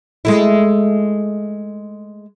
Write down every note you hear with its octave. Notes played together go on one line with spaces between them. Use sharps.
G#3 A3 E4